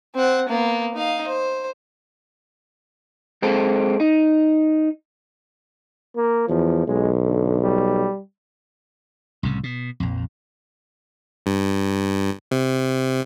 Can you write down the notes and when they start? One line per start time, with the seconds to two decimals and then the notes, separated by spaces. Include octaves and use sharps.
0.15 C4 F#5
0.49 A#3 B3
0.94 D#4 F5
1.27 C5
3.42 G#3 C4 A4
4.00 D#4
6.16 A#3
6.49 E2 F3
6.87 B1 G#3
7.26 D3
7.62 G3
9.43 C2 A2 C#3
9.64 B2
10.00 A#1 F2
11.46 G2
12.51 C3